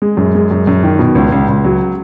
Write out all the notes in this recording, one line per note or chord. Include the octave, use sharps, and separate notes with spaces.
G#3
F#2
G#3
F#2
F#2
D#3
B2
C#2
C#2
C#2
F#3